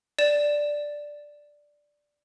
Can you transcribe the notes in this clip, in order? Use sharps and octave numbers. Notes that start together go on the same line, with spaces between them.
D5 E7